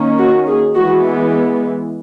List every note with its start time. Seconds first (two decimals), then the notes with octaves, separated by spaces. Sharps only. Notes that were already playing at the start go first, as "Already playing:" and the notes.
Already playing: D#3 A#3 C#4
0.18 F#4
0.47 G#4
0.75 E3 G#3 B3 F#4